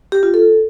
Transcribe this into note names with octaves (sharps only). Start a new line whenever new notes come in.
G4
F4
A4